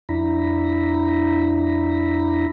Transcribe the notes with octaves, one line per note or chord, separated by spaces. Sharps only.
F2 D4 E4 A#5 B5